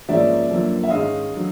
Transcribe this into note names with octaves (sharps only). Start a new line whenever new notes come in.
G#2 F3 A#3 C#4 D5 E5
F#2 D3 F3 A#3
E5
G#2 D#3 G#3 C#4 D#5 F5
D3 F#3